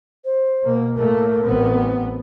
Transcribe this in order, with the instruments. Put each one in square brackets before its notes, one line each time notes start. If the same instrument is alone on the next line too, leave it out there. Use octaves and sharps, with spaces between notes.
[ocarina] C5
[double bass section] B2 A#3
[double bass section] A2 A3 A#3 [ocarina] A#4
[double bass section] A1 B3 C4